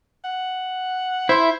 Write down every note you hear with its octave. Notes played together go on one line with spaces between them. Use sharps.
F#5
E4 C5 E5 C6